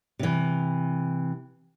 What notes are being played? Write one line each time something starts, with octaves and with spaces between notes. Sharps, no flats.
C3 E3